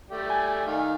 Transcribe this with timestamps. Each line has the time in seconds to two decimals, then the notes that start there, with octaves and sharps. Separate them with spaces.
0.10 A3 G4 D5
0.30 G#5
0.66 D#3 F5